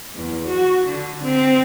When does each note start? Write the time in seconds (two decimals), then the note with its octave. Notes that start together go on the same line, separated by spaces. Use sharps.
0.14 E2
0.46 F#4
0.86 D3
1.22 C4